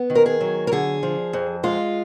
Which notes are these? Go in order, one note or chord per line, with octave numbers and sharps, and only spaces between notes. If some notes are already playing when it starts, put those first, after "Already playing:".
Already playing: B3
D#3
A#4
G#4
F#3
A#4
D3 G#4
F3
F2
G#3 F4